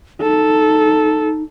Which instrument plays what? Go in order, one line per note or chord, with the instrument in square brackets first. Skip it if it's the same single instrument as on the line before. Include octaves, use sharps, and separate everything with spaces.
[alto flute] D#4 [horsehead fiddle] A4